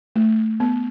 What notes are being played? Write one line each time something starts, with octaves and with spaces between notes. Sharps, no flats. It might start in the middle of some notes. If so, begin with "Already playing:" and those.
A3
B3